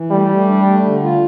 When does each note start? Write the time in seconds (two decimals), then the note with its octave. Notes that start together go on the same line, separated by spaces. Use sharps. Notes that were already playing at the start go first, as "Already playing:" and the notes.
Already playing: E3
0.11 G3 A3
0.29 A3
0.48 D4
0.66 A3
0.85 D3
1.03 F4